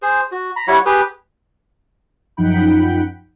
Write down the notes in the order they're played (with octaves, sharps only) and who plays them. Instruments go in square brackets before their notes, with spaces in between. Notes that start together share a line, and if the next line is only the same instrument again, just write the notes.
[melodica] G#4 C5
F#4
A#5 B5
G3 E4 C#5 F#5
G4 G#4 B4
[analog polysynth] F#2 F3 D#4 F#5 G5 B5